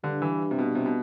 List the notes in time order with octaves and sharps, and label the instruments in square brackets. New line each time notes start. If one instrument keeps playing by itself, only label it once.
[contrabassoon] G2 [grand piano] D3
[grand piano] E3
C3
B2
C3
B2